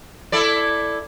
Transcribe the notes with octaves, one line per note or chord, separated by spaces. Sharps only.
E4 A4 D5